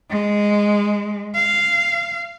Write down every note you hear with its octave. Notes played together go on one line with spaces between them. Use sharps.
G#3
F5